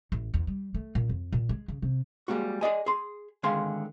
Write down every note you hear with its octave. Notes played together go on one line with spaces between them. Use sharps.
A1
E2
G3
A3
A#2
F2
A#2
G#3
C#3
C3
G3 G#3 A#3 F#4
G#4 D5 D#5 G#5
G#4 C6
D3 D#3 G#3 F5 G#5 C6